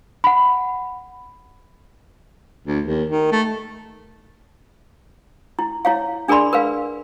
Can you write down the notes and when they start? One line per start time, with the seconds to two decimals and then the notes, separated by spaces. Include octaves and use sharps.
0.24 F#5 B5
2.67 D2
2.86 D#2
3.10 D#3
3.32 A3
5.59 E4
5.85 E4 C#5 F5
6.28 D4 G#4 A#4 D5 B5 C6
6.53 A#4 B4 F5